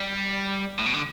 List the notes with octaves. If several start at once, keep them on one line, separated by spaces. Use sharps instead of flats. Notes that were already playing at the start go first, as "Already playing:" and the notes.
Already playing: G3
A2
B2
D3